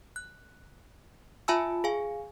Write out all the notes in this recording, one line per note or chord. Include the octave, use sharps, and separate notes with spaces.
F#6
F4 E5 G#5 A5 B5 E6
G#4 F5 G#5